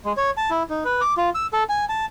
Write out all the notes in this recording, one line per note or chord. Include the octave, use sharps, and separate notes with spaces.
G#3
C#5
A5
E4
D#4
B4
D6
F4
E6
A4
G#5
A5